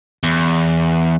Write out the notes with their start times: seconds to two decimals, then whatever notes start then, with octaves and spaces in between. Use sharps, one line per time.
0.23 E2